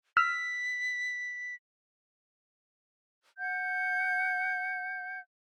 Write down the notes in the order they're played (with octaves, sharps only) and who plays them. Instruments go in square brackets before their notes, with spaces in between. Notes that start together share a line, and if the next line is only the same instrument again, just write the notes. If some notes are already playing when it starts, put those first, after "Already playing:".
[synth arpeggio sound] E6 F6 [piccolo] B6
[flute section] F#5 G6